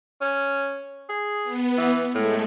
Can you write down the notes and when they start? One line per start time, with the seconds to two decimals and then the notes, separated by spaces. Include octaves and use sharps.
0.21 C#4
1.09 G#4
1.44 B3
1.77 E3
2.14 A2 G#3 A3